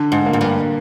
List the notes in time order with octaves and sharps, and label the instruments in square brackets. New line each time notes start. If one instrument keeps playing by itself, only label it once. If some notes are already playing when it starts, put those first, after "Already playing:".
Already playing: [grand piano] D3
[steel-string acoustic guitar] G#2
[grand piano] A#3
[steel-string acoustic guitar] G#2
G2